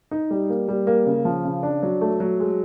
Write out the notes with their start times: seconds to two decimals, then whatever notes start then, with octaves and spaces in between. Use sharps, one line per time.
0.11 D#4
0.31 G3
0.49 A#3
0.68 G3
0.87 A#3
1.06 C#3
1.25 F3
1.45 C#3
1.63 D4
1.83 F#3
2.01 A3
2.20 F#3
2.40 G#3